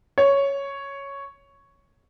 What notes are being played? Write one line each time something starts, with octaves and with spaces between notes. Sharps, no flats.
C#5